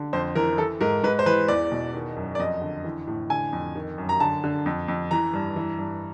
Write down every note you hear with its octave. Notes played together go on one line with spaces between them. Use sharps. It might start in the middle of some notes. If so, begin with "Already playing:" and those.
Already playing: D3
F2 C5
E3 A#4
E3 A4
G#2 A#4
G#2 B4
C5
E3 B4
E2 D5
B2
D#3
F#2
D5
F2 D#5
D3
E3
A2
D3 G#5
F2
D#3
F#2
A#5
D3 A5
D3
F2
F2
E3 A#5
G2
E3
G2